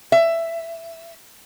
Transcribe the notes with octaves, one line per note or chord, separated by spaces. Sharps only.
E5